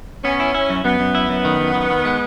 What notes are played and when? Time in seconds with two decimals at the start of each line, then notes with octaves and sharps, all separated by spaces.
0.24 B3 C#4
0.40 E4
0.54 E4
0.70 F#2
0.84 F#2 B3
1.00 F#2
1.15 E4
1.29 F#2
1.45 D#3
1.60 F#2
1.75 D#3
1.90 D#3
2.05 G#3